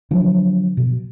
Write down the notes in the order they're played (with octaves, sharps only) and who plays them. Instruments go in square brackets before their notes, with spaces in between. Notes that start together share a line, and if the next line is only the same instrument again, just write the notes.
[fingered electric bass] D3 F3 F#3 D4
B2